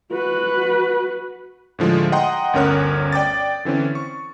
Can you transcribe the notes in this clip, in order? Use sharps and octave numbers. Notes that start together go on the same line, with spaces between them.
F#4 B4
A2 D3 F3 G#3
D#5 F#5 G5 A#5 C6 D#6
G1 D2 C#4 A#4 C#5 F#6
D5 G5 D6 A6
D3 E3 C4 C#4
C#6